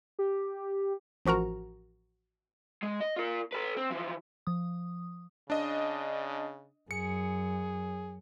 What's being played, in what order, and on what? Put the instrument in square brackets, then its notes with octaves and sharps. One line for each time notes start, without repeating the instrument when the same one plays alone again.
[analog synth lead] G4
[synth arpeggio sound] A1 F3 F#4 A#4 A#5
[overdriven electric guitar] G#3
D#5
F4 A#4
A4 B4
C4
E3 F3
[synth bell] F3 D#6
[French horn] C#3 [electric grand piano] D4 D#5
[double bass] F#2 [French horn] G#4 [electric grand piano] C#7